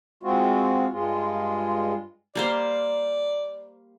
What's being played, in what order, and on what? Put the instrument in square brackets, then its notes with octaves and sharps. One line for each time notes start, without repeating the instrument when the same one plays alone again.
[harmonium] G#3 C4 F4 F#4
G2 G#3 F4
[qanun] G3 A#3 C5 [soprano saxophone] D5